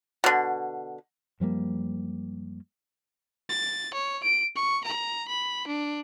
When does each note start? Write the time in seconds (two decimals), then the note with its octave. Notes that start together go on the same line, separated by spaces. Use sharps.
0.24 B2 D3
1.40 F#2 F3 G3 A#3
3.49 A6
3.94 C#5
4.23 D7
4.55 C#6
4.84 A#5
5.28 B5
5.67 D4